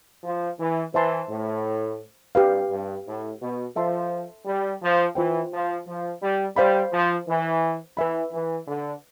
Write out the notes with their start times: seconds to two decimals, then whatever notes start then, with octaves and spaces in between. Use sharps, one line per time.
0.24 F3
0.58 E3
0.93 E3 C5 E5 A5 C6
1.29 A2
2.35 G2 G4 B4 F5
2.70 G2
3.06 A2
3.40 B2
3.75 F3 A4 E5 A5 C6
4.46 G3
4.81 F3
5.15 E3 F4 C5 G5
5.52 F3
5.87 F3
6.21 G3
6.56 G3 C5 F5 B5
6.91 F3
7.27 E3
7.97 E3 B4 E5 B5
8.32 E3
8.68 D3